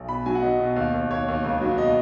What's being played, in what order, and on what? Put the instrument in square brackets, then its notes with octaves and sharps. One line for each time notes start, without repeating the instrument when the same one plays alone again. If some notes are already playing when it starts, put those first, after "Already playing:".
Already playing: [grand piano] B1
B2 B5
F#3 G#5
F#5
F#3 D#5
B2
D#2
D#2
D#2 C#5
D#2
C#2
F#3
B2 D#5